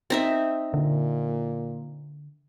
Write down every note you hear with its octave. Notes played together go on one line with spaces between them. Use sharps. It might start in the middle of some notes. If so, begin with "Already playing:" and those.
C4 D#4 E5
A#2 D3